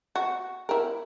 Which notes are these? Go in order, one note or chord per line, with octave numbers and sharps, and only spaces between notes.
F#4
E4 A#4